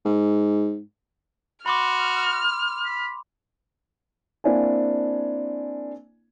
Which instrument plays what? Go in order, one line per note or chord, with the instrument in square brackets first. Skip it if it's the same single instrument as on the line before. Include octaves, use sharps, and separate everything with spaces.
[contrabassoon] G#2
[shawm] F#4 [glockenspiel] B5 C6 D6 [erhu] F6
[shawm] B5
[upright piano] A#3 C4 D4 E4 G#5